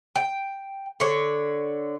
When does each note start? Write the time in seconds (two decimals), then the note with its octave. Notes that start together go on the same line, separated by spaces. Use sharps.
0.16 G5
1.00 D3 C#5